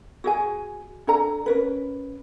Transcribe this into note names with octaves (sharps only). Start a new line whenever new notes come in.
F#4 G#4 G#5
D4 A4 A#5
C#4 A#4 B4